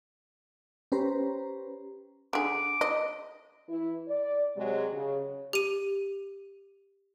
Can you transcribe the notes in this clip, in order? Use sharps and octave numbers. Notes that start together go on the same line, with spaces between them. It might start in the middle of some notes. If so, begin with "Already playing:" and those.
C#4 G4 B4 C5 A#5
D3 G#4 D6
D#5
E3 E4
D5
C3 F#3 G#3
C#3
G4 D#7